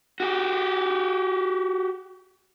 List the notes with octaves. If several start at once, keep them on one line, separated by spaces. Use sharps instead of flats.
F#4 G4